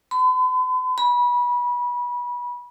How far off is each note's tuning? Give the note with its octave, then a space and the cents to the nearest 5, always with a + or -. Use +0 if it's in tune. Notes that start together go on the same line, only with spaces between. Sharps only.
B5 +45
B5 -25